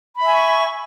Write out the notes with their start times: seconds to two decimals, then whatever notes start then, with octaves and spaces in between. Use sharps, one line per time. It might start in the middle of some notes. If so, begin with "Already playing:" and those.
0.16 B5
0.21 E5
0.26 G#5
0.30 C#6